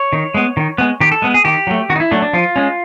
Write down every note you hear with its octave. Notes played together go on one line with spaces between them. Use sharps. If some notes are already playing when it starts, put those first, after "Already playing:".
Already playing: C#5
D#3
G#3 B3
D#3
G#3 B3
D#3 G4
A4
G#3 B3
G#4
D#3 G4
F#3 A3
D#3 F#4
D#4
E4
F#3 A3 D4
D4
F3 F4
G#3 C#4